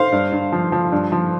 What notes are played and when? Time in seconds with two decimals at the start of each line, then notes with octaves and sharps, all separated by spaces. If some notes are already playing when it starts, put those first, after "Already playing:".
Already playing: C5 F5
0.12 G2
0.32 G2
0.52 F3
0.72 F3
0.92 G2
1.12 F3